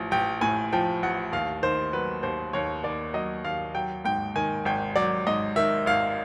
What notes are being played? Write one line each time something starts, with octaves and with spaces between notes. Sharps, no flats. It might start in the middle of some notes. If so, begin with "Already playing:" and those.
Already playing: A1 F3
A1 G5
A2 G#5
F3 G5
A1 F#5
D#2 F5
D#3 C5
F#3 B4
D#2 C5
D#2 C#5
D#3 D5
F#3 D#5
D#2 F5
F#3 G5
G#2 G5
D#3 G#5
G#1 G5
F#3 D5
G#2 D#5
D#3 E5
G#1 F5